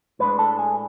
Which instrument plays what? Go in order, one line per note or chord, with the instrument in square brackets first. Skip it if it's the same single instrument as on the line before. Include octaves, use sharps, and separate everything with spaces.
[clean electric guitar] A2 G#3 D4 B4
A4
G#4